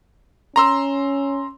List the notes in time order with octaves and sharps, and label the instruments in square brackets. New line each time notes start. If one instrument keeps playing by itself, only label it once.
[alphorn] C#4 [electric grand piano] A#5 C6 E6